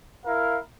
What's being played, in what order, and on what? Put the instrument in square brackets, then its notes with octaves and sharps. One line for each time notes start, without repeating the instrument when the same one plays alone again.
[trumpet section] E4 A#4 F5